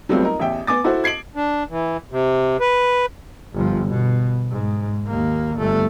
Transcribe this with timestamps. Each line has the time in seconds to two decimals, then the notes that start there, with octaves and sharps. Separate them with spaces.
0.09 F#3 G3 A3 B3 C4 F4
0.22 D#4 A#4
0.40 A1 E2 E5 G5
0.67 B3 G#5 D6 A6
0.84 E4 F#4 A4 C5
1.04 G#6 C7 D7 F#7
1.35 D4
1.70 E3
2.11 C3
2.60 B4
3.54 G1 F3
3.88 B2
4.51 G#2
5.07 D#2 A#3
5.57 G1 A3